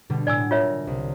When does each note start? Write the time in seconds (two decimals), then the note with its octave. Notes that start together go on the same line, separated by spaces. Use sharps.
0.10 B2 D3 G3
0.27 A2 F#3 D5 G#5 E6
0.51 F4 A#4 C#5 E5
0.87 C2